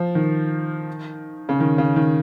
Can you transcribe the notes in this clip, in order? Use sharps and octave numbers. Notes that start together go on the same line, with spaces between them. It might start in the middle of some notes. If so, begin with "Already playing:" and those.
Already playing: F3
D#3
C#3
D#3
C#3
D#3